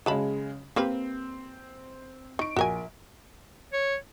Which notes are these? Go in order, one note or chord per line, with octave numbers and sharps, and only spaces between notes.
C#3 F#3 G#3 A5 B5
A#3 C4 G4 B4
D#4 C#6 D7
A#1 F#4 A#4 G#5
C#5